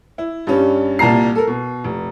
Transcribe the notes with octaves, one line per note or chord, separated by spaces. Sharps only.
E4
G2 G3 C#4
C2 A#2 A5 A#5 C7
A4 A#4
B2
F1